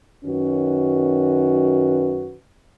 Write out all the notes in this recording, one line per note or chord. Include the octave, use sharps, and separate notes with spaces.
F#2 D#3 C#4 F#4 B4